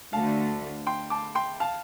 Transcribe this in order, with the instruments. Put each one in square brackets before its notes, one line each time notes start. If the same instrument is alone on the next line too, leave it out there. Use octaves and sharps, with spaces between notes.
[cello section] D2 D3 A3 [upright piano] F5 A5
[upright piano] G5 C6
A5 D6
G5 C6
F5 A5